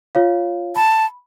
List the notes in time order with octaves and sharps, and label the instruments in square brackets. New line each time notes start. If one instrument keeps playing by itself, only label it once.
[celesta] F4 C#5 F5
[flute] A5 [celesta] B5